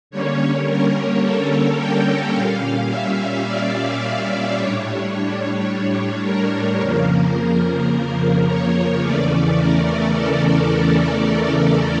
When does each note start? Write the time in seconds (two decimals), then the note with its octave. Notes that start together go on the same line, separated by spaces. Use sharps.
0.11 D3 G3 A#3 C#4 C#5
0.66 A#4
1.22 A4
1.78 G5
2.34 A#2 G3 C#4 F5
2.89 E5
3.45 D5
4.57 A2 G3 D4 C#5
5.68 C#5
6.24 A#4
6.80 F2 C#3 F3 A#3 A#4
8.47 C#5
9.03 E2 C#3 E3 A3 C#4 D5
9.59 A#4
10.15 A4